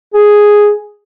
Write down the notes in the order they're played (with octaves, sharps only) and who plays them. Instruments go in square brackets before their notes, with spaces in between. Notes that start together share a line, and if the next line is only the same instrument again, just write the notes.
[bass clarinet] G#4